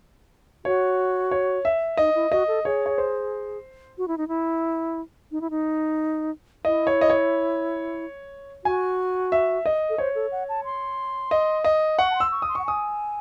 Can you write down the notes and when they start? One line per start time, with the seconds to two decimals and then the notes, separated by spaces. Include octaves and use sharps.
0.65 F#4 C#5
1.31 C#5
1.65 E5
1.97 D#4 D#5
2.15 E4
2.31 F#4 D#5
2.48 A4
2.65 G#4 C#5
2.86 C#5
2.98 C5
3.98 F#4
4.08 E4
4.18 D#4
4.28 E4
5.31 D#4
5.41 E4
5.50 D#4
6.65 E4 D#5
6.87 C#5
7.01 D#5
7.10 C#5
8.64 F#4 G#5
9.32 E5
9.66 D#5
9.90 A4
9.98 C5 C#5
10.15 A4
10.32 F#5
10.49 A5
10.64 C6
11.31 D#5
11.65 D#5
11.98 F#5 C#6
12.11 A5
12.15 C6
12.20 E6
12.31 C#6
12.42 D#6
12.49 C6
12.55 F#5 C#6
12.65 G#5 D#6